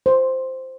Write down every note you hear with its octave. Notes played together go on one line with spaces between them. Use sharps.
C5